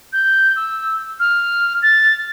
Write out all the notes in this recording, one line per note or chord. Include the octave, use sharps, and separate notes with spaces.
G6
E6
F6
A6